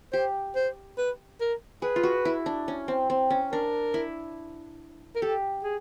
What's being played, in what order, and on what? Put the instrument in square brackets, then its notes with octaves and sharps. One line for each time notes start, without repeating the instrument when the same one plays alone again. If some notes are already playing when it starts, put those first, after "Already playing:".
[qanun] G4 [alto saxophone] C5
[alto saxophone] C5
B4
A#4
[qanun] G#4 [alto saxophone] B4
[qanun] F4
F#4
E4
D4
C#4
C4
C4
C#4
[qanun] D4 [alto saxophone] A#4
[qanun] E4
[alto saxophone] A#4
[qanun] G4 [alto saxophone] A4
[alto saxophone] G#4